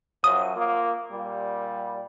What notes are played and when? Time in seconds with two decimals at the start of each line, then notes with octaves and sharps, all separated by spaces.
0.24 F#2 F3 F#3 D#6
0.56 A#3 F4
1.12 A#2 G3